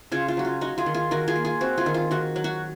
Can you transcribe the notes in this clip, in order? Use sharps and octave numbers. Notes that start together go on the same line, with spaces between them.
C#3 F4 G#4
F4
F#3 F#4
F4
D#4 F#4
F4 G#4
D#3
F4 G#4
D#3 F#4 A#4
F4 G#4
A#3
F4 G#4
C4 F#4
F4 G#4
D#3
F4
D#3 F#4
F#3
F#4